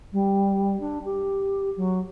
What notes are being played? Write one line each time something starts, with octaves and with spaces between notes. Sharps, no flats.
G3
D4
G4
F#3